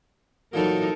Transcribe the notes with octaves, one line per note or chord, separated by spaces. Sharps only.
A#2 E3 F#3 D#4 A4 A#4